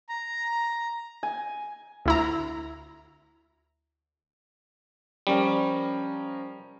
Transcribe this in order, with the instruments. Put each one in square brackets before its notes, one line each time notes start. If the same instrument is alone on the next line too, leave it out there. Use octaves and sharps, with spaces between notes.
[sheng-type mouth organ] A#5
[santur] G#5
[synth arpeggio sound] D2 E4 A#5
[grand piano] F3 C#4 A#4 [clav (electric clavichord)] G3